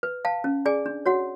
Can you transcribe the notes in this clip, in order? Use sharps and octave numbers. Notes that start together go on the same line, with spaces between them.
B4
F5 A5
C#4
G#4 D5 G#5
D4
F#4 C#5 F#5